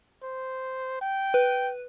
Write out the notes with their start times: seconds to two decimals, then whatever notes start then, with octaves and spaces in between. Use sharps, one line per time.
0.23 C5
1.01 G5
1.34 B4